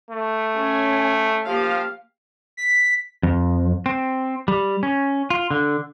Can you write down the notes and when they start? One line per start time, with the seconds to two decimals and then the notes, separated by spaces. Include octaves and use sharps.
0.10 A3
0.57 C#4 G#5
1.47 F3 A#3 G4 F5
2.57 B6
3.23 F2
3.86 C4
4.48 G3
4.83 C#4
5.30 F4
5.51 D3